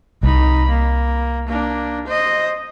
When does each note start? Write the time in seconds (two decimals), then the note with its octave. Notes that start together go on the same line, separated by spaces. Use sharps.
0.23 C2 D#4 B5
0.69 A#3
1.48 A#3 D4
2.07 C5 D#5